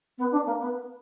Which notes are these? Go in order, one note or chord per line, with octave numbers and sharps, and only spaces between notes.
B3
D4
A#3
B3